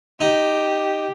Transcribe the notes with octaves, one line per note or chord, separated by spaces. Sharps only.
D#4 G4